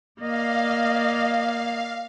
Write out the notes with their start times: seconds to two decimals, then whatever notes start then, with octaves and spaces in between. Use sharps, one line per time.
0.20 A#3 D5 D#5 F5